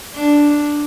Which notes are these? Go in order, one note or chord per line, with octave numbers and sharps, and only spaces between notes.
D4